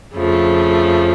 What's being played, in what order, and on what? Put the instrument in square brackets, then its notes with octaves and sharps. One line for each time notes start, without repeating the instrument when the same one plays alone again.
[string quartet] F2 C#3 F3 A3